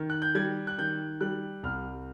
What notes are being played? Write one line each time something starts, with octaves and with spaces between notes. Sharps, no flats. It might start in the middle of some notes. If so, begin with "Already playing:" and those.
Already playing: D#3
F#6
G6
G3 G#6
F#6
D#3 G6
G3 F#6
C2 F6